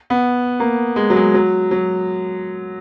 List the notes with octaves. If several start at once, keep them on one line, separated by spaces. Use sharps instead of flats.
B3
A#3
G#3
F#3
G#3
F#3
F#3